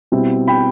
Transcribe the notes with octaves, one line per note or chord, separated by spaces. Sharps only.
B2 G3 C4 E4
G5 B5